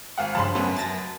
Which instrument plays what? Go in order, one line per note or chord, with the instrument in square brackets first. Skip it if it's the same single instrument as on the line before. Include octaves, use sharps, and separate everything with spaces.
[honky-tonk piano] G#1 F5 F#5
[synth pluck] G2 C#3 F3 [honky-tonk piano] A5 B5 C6
[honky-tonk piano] F#2 [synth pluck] A3 B3 C#4
[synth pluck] A5 A6 A#6